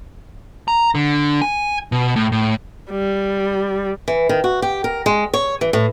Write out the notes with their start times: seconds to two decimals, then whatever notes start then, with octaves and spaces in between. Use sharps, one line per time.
0.68 A#5
0.95 D3
1.42 G#5
1.92 B2
2.16 A2
2.32 A2
2.91 G3
4.08 E3
4.29 D#3
4.44 F#4
4.62 G4
4.84 A#4
5.06 G#3
5.33 C#5
5.61 E3
5.73 A2